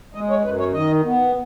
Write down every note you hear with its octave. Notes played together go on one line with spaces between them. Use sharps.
G#3 D#5
C#5
F#2 B4
C#5
D#3 D#5
B3